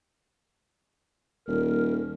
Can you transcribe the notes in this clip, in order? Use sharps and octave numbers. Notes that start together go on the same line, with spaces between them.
D#1 A#4